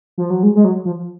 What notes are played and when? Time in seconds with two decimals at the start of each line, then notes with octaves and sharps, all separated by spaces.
0.18 F3
0.30 F#3
0.43 G#3
0.55 G#3
0.65 F#3
0.85 F3